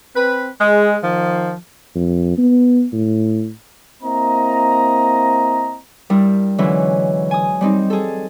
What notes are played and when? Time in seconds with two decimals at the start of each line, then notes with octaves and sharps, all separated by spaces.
0.14 C4 B4
0.59 G#3
1.03 D#3 F3
1.95 F2
2.38 B3
2.92 A2
4.03 A#3 C4 E4 D#5 A#5
6.10 G2 G3 E4 A#4
6.58 G#2 D3 E3 F#3 C#4 E4
7.31 G#5 D#6
7.61 G3 C4 D#4
7.90 G#4 A4